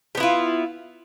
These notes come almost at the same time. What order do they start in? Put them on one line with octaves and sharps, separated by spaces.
G4 B3 E4 F4